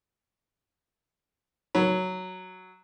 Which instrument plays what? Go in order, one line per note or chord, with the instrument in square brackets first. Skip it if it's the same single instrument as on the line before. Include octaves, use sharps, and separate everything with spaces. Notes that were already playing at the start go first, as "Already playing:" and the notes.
[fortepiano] F#3